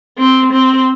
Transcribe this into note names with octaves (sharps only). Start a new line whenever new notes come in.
C4
C4